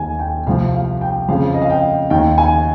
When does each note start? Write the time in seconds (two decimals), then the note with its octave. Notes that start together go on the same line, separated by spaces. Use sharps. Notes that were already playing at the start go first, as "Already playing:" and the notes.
Already playing: D#2 D#3 G#5
0.19 G5
0.47 C2 C3 F3 F5
0.74 F5
1.01 G5
1.28 F2 C#3 F3 F5
1.54 D#5
1.62 F5
1.70 G5
2.10 D#2 D#3 G5
2.38 G#5